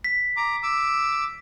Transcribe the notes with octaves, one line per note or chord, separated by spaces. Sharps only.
B6
A#5 D6
D6 E6